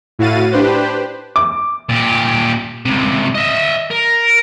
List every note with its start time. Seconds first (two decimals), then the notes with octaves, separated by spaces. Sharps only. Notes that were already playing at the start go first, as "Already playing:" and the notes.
0.19 A2 E4 F#4 F5 A6 D#7
0.52 D4 G4 B4 C5
1.36 D6
1.89 A#2 G4
2.85 C#2 C3
3.35 D#5 E5
3.91 A#4